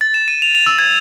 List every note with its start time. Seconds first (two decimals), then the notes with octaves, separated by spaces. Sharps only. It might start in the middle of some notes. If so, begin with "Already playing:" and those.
0.01 A6
0.14 E7
0.28 D#7
0.42 F7
0.55 F7
0.66 E6
0.79 G#6